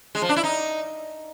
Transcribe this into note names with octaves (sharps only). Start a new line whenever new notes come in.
G#3
F3
D4
E4
D#4